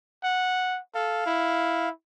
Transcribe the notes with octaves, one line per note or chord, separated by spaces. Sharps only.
F#5
A4 F5
E4